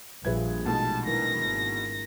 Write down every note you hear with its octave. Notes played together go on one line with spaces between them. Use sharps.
A#1 G3 F4 G#4 B4 E5 G#6
B2 G#3 A3 D#4 A5
E3 D4 E4 A#4 A#6
G#1